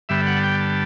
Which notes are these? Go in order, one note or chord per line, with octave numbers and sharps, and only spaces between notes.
G2 D3 G3 B3 E5
F#5
A5
G5
A5